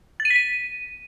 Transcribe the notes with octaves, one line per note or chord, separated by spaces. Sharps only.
A6
D#7
B6
D#7